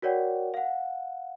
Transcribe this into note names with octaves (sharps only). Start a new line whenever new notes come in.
F#4 A#4 C#5 D5 F#5 G5
F5 F#5